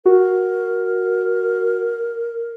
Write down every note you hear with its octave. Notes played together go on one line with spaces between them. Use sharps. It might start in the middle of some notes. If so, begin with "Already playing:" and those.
F#4 A#4